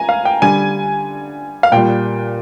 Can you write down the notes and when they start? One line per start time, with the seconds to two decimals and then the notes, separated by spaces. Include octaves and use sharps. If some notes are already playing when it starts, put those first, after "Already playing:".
Already playing: G#5 A#5
0.09 F5
0.25 G5
0.42 D3 G3 G#5
1.63 F5
1.72 A#2 G3 G5